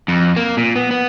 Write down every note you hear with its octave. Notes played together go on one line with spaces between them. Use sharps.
F2
A#3
A#2
B3
B3